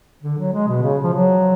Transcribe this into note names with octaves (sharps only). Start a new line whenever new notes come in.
D3
F#3
G#3
B2
C#3
F3
F#3